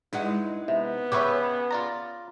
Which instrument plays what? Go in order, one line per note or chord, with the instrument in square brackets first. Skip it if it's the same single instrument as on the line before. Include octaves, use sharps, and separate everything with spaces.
[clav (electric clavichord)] G2 F#5 [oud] G#3 D#4 E4
[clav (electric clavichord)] C3 [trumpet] B3 [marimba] E5
[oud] C#3 [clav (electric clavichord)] G4 B4 E5 [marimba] C#5 C#6 D6
[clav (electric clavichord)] F4 D5 A#5